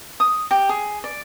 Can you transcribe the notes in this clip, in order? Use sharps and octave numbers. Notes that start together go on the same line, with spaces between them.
D#6
G4
G#4
D5